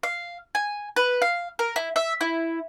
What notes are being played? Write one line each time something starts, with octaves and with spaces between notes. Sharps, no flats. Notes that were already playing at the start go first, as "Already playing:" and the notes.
F5
G#5
B4
F5
A#4
E4
E5
E4